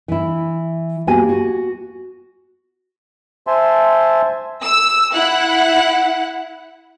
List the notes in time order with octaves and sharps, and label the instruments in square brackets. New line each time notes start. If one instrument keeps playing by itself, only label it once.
[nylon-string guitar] E3 E4
A#3 B3 F#4 G4 G#5
F#4
[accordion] C5 E5 G#5 A5 C6
[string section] E6
E4 F#5